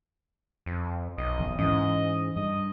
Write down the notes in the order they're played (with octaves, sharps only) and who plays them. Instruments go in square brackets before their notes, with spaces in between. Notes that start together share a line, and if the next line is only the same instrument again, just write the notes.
[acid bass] F2
[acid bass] B1 [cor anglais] D#5
[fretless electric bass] D1 A1 E2
[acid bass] G#2 [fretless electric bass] E3 C#4 [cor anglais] D#5
[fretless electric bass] G2 [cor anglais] D#5